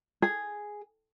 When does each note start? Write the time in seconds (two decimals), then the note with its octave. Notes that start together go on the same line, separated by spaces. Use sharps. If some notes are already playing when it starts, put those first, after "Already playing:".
0.22 G#4